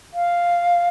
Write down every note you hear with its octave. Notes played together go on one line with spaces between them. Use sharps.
F5